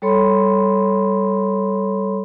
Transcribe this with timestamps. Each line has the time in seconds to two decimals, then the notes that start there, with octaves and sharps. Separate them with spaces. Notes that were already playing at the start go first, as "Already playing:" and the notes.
0.02 G3 A4 C#5 B5 C6